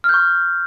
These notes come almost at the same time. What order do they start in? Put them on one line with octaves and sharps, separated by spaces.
F6 G6 C#6